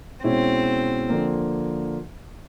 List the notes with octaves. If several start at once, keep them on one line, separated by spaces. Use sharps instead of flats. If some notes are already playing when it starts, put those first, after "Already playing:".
B2 G#3 C4 C#4 E4
D3 F3 A#3